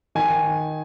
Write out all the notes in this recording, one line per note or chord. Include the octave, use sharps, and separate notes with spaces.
D#3 G#5